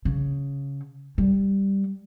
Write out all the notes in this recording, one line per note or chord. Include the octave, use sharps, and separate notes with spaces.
C#3
G3